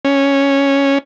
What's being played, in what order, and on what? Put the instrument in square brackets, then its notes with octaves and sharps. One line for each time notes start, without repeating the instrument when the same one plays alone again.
[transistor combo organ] C#4